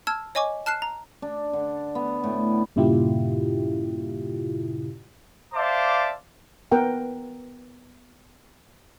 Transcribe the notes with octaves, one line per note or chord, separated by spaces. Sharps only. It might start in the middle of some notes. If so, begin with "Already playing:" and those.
A5 E6 F6 G#6
C#5 D#5 G#5 C#6 D6
A5 F6 F#6 C7 E7
A#5
D4
D3
B3
A2
G2 A#2 C#3 E4 F4 G4
C5 D5 E5 F5 A5 D6
B3 A#4 B4 F#5 G5